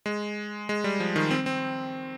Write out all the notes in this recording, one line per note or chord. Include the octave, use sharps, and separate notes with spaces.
G#3
G#3
G3
F3
D#3
C4
C4